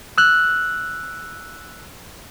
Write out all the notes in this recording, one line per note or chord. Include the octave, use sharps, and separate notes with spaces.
E6 F#6